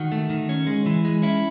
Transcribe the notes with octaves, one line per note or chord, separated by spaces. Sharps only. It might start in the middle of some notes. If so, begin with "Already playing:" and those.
Already playing: D#3 F#4
A3
D#3
C#4
G#3
E3
G#3
C#4 E4